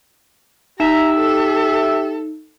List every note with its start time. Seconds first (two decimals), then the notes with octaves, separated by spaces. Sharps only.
0.80 D#4 G4 E5 A#5
1.16 A4